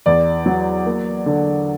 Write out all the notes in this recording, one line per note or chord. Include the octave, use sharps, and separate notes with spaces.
E2 D5
F#3
A#3
D3